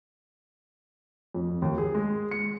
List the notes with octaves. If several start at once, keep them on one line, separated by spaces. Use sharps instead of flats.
F2
D#2
G#4
G#3
C#7